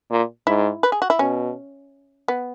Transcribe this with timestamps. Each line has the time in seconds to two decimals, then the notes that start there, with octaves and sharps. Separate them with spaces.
0.11 A#2
0.47 G#2 E4
0.83 B4
0.92 G#4
1.02 F#4
1.10 E4
1.19 B2 C#4
2.28 B3